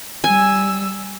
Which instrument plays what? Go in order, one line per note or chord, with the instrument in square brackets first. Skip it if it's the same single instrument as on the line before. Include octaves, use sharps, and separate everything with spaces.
[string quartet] G3 E6 [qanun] G#5